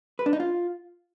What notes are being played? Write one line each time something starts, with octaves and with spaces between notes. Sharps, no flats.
B4
D4
D#4
F4